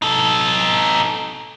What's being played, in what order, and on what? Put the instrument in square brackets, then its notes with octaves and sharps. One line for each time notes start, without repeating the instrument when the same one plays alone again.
[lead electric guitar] D#4 A4